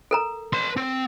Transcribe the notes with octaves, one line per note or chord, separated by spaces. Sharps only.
A4 A#4 A#5
B4 C6
C4